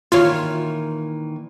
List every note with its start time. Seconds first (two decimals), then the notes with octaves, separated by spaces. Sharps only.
0.12 A#2 D#3 E3 F4 C#5 F6